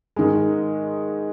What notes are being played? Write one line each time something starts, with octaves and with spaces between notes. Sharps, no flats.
G#2 D#3 G#3